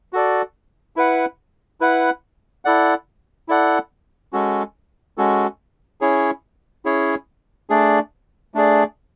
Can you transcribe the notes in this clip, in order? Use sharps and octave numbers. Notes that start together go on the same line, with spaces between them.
F#4 A4 D5
E4 B4 F#5
E4 B4 F#5
E4 A4 D5 F#5
E4 A4 D5 F#5
G#3 C#4 F#4 A4
G#3 C#4 F#4 A4
C#4 E4 G#4 C#5
C#4 E4 G#4 C#5
A3 D4 G#4 D5
A3 D4 G#4 D5